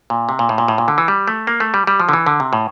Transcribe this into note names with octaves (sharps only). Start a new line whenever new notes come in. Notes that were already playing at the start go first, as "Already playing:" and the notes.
A#2
C3
A#2
A2
A#2
A2
A#2
D3
E3
G3
A3
A#3
A3
G3
G3
F3
D3
E3
D3
C3
A2